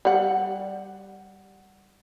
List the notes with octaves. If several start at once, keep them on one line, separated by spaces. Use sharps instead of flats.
G3 F#5